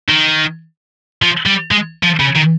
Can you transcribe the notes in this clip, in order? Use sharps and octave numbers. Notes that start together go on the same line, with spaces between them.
D#3
F3
G3
G#3
F3
C#3
D#3